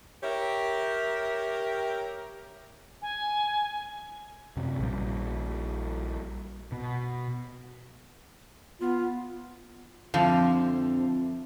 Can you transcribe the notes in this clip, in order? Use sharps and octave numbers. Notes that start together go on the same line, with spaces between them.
G4 A#4 C#5 E5
G#5
F#2 C3
A#1 A#2 G3
B2
B3 F4
F2 D3 F3 C4 F4 E5 F5